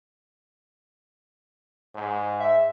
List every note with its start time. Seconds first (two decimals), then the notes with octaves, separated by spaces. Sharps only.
1.95 G#2
2.40 E5